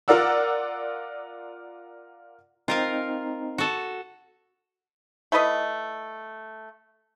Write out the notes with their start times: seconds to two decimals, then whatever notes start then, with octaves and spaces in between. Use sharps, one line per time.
0.08 F4 A#4 D5 F#5 E6
2.68 C4 D#4 F4 A#4 F5
3.58 F#4 A4
5.32 A3 E4 B4 D#5